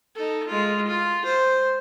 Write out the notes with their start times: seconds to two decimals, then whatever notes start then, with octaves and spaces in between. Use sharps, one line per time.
0.15 D#4 A4
0.47 G#3 F4
0.87 F4
1.25 C5